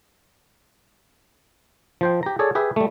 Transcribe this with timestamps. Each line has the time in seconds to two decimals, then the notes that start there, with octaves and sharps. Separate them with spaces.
2.01 F3 C5 G5
2.23 G4 A#5
2.39 G#4 A4 C#5 D5
2.55 G4 G#4 B4 E5
2.76 G3 A3